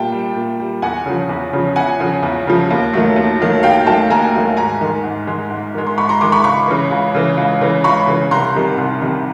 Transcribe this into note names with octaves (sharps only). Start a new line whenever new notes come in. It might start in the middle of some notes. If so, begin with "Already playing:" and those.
Already playing: A#2 G3 G5 A5
G3
A#2
G3
E2 F#5 G#5
C#3 F3
E2
C#3 F3
E2 F#5 G#5
C#3 F3
E2
C#3 F3
D#2
D#3 F#3 A3
D#2
D#3 F#3 A3
D#2 F5 G5
D#3 F#3 A3 G5 A5
D#2 G#5 A#5
D#3 F#3 A3
G#2 G#5 A#5
D#3 G#3
G#2
D#3 G#3
G#2
D#3 G#3
C6
G#2 B5 C#6
A#5 C6
D#3 G#3 C6 D6
B5 C#6
C#2 B5 C#6
C#3 E3
C#2
C#3 E3
C#2
C#3 E3
C#2 B5 C#6
C#3 E3
C2 A#5 C6
C3 D#3 G3
C2
C3 D#3 G3